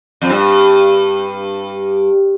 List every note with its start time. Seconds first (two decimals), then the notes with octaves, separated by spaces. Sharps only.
0.21 F2
0.29 G2